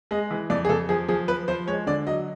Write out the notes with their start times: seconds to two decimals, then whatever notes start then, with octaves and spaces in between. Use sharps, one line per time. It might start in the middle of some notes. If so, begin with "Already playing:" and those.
0.11 G#3 D#5
0.31 E3
0.50 F2 D5
0.65 G#4
0.69 F2 A4
0.89 F3 G#4
1.08 F3 G#4
1.28 F3 B4
1.48 F3 C5
1.67 G#3 C#5
1.87 D3 D5
2.07 F#3 D#5